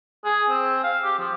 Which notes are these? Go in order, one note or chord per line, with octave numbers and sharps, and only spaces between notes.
G#4
C4
F5
G4
F3